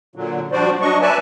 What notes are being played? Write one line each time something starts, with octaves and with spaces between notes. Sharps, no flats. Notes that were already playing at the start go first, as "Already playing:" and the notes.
A#2 D3 F#3
F3 G3 D4 F#4 C5 D5
F#3 D4 D#5 C#6
B4 D5 E5 G#5 A5